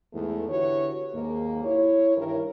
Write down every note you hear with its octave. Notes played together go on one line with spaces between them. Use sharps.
E2 G#2 A3
D3 E4 F#4 G4 B4 C#5
D#2 G#2 A#3
E4 C#5
G2 D#3 E3 G3 E4 A#4